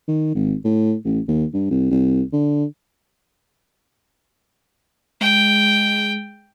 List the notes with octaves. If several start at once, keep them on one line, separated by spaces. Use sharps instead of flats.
D#3
G#1
A2
A1
D#2
G2
C2
C2
D3
G#3 G5